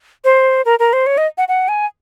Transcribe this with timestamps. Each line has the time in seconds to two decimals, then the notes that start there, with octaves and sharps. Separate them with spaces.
0.24 C5
0.65 A#4
0.79 A#4
0.93 C5
1.06 C#5
1.18 D#5
1.38 F#5
1.48 F#5
1.68 G#5